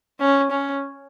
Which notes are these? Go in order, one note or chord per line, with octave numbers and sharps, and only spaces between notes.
C#4
C#4